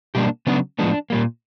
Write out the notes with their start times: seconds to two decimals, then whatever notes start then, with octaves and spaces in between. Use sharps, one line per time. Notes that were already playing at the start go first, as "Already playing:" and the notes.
0.15 B2 G3 A#3 D4 G4
0.47 C#3 F#3 B3 D4 F#4
0.79 A2 F3 G#3 B3 D4
1.10 A#2 G3 A#3